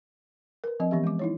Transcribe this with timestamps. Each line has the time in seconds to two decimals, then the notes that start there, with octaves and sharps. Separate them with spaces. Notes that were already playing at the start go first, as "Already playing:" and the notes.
0.64 A#4 B4
0.80 F3 C4 D#5
0.91 E3 B3 C#4 G4 E5
1.04 G#3 D6
1.19 D#4 E4 C#5